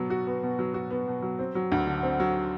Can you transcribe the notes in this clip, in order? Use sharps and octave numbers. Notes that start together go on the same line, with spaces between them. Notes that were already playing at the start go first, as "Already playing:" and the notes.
Already playing: B2 F#3 B3
F#4
B3
B2
F#3
F#4
B3
B2
F#3
C4
F#3
D2
D3
C4
F#3